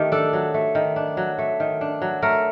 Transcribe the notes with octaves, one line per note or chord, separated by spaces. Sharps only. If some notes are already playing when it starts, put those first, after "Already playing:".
Already playing: D#3 A3 G4
D4 A4
F#3
A3
D#3
D4
F#3
A3
D#3
D4
F#3
A3 A#4